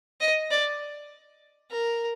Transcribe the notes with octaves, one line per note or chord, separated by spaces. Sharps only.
D#5
D5
A#4